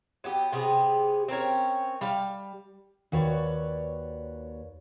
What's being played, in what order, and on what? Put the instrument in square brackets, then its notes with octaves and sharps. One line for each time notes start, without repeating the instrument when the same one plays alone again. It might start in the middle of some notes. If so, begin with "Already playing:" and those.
[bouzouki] F#3 B3 G4
C3 B3 G4 G#4
C4 C#4 A#4 C#5
G3 F5
[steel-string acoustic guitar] D#2 F#4 B4 C#5 D5